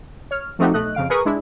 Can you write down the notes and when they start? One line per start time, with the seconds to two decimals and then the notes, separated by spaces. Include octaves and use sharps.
0.31 C#5 F6
0.59 F3 A3 C4 D#4 F#4 G4
0.74 B1 A3 D#5 F#6
0.95 F2 C#3 F5 D7
1.10 G#4 A#4 B4 C#6 D#6
1.25 G#3 D4 E4